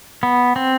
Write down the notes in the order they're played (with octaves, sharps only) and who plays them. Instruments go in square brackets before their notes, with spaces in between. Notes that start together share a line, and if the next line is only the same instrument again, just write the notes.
[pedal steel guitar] B3
C4